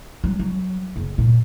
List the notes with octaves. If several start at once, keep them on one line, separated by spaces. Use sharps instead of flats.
F#3
F#3
F#1
A#2